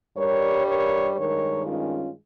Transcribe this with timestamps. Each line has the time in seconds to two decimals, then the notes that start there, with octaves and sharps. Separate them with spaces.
0.17 G2 G3 A#4 C#5
0.66 A#4 C#5
1.16 G2 D#3 G#3 A#4 C#5
1.65 C#4 F4